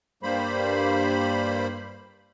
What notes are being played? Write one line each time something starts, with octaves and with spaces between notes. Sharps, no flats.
G2 G3 A#3 C5 B5